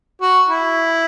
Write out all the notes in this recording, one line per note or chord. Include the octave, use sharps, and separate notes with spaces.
F#4
E4